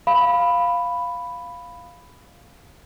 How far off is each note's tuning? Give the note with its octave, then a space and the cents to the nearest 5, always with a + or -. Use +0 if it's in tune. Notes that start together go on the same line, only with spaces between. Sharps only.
F5 +0 B5 +5